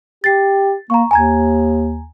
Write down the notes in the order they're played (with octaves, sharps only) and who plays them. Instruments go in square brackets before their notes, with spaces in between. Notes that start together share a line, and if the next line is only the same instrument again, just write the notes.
[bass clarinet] G4 [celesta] A6 C7
[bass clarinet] A#3 [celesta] A#5 C#6
[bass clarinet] D#2 [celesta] G#5 A#5 G#6